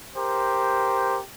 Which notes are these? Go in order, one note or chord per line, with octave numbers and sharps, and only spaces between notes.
G4 A#4 C5